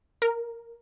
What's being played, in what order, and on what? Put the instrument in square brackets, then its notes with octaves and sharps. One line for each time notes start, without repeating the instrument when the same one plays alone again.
[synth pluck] A#4